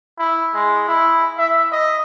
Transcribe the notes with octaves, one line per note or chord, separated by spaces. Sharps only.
E4
G#3
E4
E5
D#5